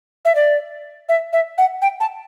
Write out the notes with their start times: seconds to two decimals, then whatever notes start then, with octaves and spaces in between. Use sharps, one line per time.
0.25 E5
0.35 D5
1.09 E5
1.33 E5
1.58 F#5
1.82 G5
2.00 A5